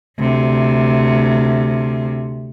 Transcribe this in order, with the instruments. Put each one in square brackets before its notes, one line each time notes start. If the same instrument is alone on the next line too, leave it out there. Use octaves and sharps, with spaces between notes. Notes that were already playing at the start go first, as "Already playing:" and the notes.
[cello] D2 C3